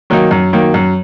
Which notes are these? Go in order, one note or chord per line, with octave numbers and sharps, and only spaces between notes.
D#3 F#3 A#3 D#4
F#2
D#3 F#3 A#3 D#4
F#2